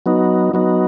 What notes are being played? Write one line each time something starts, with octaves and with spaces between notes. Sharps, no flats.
F#3 B3 D#4
F#3 B3 D#4